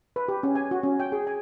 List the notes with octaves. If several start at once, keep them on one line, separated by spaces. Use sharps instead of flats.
B4
G4
C#4
G#5
F#4
C#4
G5
G#4
G#5